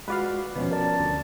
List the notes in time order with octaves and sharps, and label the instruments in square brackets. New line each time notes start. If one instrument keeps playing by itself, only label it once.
[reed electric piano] G#3 F4 F#4 [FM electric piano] B4 D5 F5
[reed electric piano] D#2 F3 C#4 [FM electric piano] B2
[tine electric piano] A#4 D5 [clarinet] A5
[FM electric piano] D2